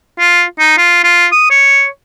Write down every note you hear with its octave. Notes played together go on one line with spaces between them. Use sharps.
F4
D#4
F4
F4
D#6
C#5